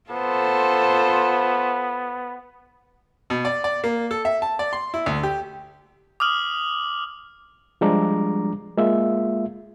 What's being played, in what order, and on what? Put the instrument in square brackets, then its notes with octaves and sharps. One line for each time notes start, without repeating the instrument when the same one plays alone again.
[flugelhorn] B3 [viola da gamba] F4 A4 C5
[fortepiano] B2
D5
D5
A#3
A4
E5
A5
D5
C6
E4
D2
G4
[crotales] D6 D#6 F6 F#7
[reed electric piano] F3 G3 G#3 D4 A#5 D6
G#3 A#3 F4 E5